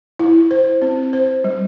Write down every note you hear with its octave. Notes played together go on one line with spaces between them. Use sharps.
E4
C5
C4
C5
G3